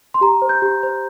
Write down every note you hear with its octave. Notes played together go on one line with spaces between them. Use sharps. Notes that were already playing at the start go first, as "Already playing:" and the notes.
C6
G4 A#5
C5
G6
G4
C5